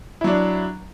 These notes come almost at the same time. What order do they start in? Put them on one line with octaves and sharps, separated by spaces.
E4 F#3 D4